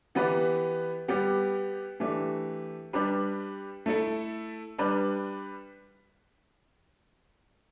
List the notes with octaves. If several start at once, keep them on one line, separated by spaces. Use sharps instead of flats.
E3 B3 G4 B4
G3 B3 G4
E3 A3 D4 G4
G3 D4 G4 B4
A3 E4 A4
G3 D4 B4